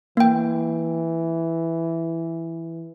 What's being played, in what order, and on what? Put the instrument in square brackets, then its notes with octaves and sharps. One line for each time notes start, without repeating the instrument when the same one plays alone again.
[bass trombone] E3 [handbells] A#3 G5